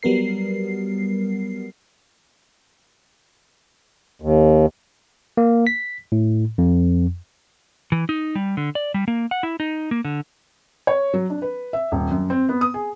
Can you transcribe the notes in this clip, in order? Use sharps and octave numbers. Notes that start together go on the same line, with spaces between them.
F#3 G3 B3 A#4 C7
D#2
A#3
B6
A2
F2
E3
D#4
G3
D3
D5
G3
A#3
F#5
E4
D#4
A#3
D3
C#5
F#3
D4
B4
E5
D#1
F#2
C4
B3
D#6
G#4